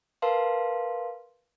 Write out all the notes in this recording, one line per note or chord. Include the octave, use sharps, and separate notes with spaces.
A#4 B4 F5 A5 C6